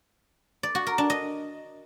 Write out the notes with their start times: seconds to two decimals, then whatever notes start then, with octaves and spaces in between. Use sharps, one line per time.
0.63 D5
0.75 F#4
0.87 A#4
0.98 D4
1.10 D#5